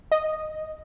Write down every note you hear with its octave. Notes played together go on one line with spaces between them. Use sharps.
D#5